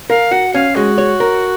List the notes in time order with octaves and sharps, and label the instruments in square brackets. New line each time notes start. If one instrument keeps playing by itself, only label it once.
[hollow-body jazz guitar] A#4 [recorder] F5
[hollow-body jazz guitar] F#4 [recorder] F#5
[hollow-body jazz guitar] C#4 [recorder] F5
[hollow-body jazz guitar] G#3 [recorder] F#4
[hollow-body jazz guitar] C#5
A#4